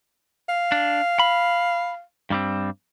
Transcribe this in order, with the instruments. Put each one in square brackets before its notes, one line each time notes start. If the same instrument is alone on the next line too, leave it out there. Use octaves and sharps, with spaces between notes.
[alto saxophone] F5
[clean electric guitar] D4
B5
G2 G3 C4